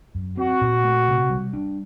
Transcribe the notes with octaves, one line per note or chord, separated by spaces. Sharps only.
F#2
C4 F#4
A#2
A3
C3
G3
D4